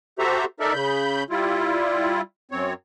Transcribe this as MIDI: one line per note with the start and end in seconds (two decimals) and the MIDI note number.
0.19 0.45 66
0.19 0.45 67
0.19 0.45 69
0.19 0.45 72
0.19 0.45 76
0.19 0.45 82
0.60 0.73 63
0.60 0.73 69
0.60 0.73 70
0.60 0.73 74
0.60 0.73 76
0.73 1.23 49
0.73 1.23 83
0.73 1.23 91
1.30 2.21 55
1.30 2.21 64
1.30 2.21 65
2.51 2.73 42
2.51 2.73 60
2.51 2.73 73